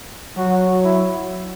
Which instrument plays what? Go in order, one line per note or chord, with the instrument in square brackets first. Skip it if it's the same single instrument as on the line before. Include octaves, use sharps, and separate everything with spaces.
[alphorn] F#3 [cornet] F#4
[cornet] E4